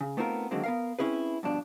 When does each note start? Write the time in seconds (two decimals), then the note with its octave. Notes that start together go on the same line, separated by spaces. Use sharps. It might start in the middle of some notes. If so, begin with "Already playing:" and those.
0.01 C#3
0.17 A3 B3 C4 D#4 F4 A#4
0.51 D3 D#3 F#3 G#3 A#3 C4
0.64 B3 A#4 F5
0.99 C4 C#4 E4 G#4 B4
1.43 G2 B2 F3 D4